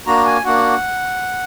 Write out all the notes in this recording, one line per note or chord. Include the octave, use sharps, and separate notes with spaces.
A#3 D4 F#4 A#5
G#5
A#3 D4 F#4 F#5